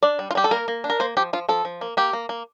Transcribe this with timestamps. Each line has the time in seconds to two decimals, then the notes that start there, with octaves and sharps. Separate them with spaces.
0.03 D4 D5
0.19 G3
0.31 F4
0.35 G3 G4
0.44 A4
0.51 A#3 A#4
0.68 A#3
0.84 D4
0.90 A#4
1.00 A#3 C5
1.17 F3 G4
1.33 F3 F4
1.49 F3 A4
1.65 F3
1.81 A#3
1.97 A#3 G4
2.13 A#3
2.29 A#3